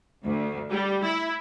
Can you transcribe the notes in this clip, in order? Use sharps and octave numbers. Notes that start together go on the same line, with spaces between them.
D2
G3
E4